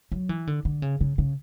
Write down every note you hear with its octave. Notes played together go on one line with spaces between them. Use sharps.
F#3
E3
D3
D3
C#3
C#3
C#3